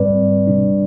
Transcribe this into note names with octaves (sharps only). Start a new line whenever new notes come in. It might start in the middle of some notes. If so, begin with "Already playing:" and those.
Already playing: G#2 G3 C4 B4 D5
C3 G3 D4